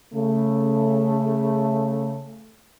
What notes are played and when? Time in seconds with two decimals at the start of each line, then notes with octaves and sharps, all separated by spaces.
0.14 C#3 A3